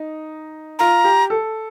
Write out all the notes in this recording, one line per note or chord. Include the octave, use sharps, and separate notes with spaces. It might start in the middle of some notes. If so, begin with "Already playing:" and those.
Already playing: D#4
F4 A#5
G4
A4